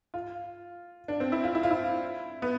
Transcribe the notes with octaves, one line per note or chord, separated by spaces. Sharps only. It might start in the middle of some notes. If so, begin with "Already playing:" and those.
F4
D4
C4
E4
F4
E4
F4
E4
B3